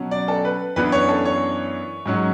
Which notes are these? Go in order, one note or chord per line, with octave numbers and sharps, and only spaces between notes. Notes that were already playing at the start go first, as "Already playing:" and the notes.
Already playing: B2 F#3 C#4
D5
A4
B4
F#2 E3 B3 D4 B4
C#5
A4
C#5
G#2 F#3 C#4